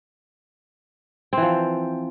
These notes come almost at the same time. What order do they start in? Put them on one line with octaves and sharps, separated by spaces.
C4 E3 F3